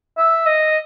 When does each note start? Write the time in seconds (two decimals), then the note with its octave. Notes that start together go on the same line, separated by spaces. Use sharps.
0.18 E5
0.46 D#5